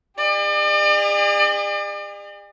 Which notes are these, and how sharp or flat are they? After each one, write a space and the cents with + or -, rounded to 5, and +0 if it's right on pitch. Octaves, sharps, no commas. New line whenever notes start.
G#4 -45 D5 +40